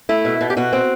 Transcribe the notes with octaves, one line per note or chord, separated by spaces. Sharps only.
A3 E4
B2
B2
G4
B2 F#4
C4